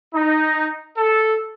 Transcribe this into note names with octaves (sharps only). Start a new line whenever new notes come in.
D#4
A4